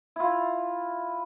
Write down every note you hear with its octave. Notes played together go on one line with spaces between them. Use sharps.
E4 F4